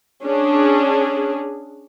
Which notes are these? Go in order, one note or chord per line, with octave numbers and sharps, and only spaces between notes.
C#4 D4 G#4